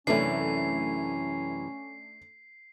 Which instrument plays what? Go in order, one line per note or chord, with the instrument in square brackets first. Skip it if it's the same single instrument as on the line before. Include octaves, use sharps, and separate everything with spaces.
[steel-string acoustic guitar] F#2 C3 E3 [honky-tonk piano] A3 D4 [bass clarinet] C#4 [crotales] C7